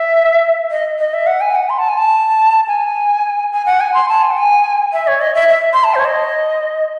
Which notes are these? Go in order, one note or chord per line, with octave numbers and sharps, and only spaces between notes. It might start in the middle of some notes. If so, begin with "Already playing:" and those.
Already playing: E5
D#5
D#5
E5
F#5
G#5
F#5
C6
A5
G#5
A5
G#5
G#5
F#5
G#5
C6
A5
G#5
F#5
G#5
E5
C#5
D#5
E5
E5
C6
A5
C5
C#5
D#5